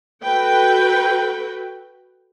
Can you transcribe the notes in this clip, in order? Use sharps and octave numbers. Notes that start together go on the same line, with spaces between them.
F#4 A4 B4 G5